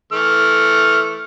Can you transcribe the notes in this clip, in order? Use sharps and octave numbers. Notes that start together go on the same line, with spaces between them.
E3 A3 F6